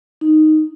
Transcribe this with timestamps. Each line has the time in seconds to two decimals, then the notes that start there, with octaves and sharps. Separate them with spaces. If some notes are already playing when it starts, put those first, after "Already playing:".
0.21 D#4